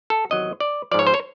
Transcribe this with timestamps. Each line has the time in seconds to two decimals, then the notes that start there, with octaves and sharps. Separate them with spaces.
0.10 A4
0.30 E2 C3 D#3 F#3 D#5
0.60 D5
0.91 F3 D5
0.94 G#2 C#5
1.07 C5
1.14 C#5